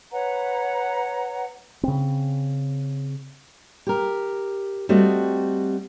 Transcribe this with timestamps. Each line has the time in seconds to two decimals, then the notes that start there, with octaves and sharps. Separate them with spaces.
0.11 B4 C#5 F#5 A#5
1.83 C#3 C4
3.87 G4 A#4
4.89 G3 A3 C4 F#4 D#5